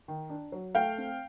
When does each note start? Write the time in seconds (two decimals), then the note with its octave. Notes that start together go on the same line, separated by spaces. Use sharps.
0.08 D#3
0.30 D4
0.52 F#3
0.75 A3 F5 G5
0.98 C4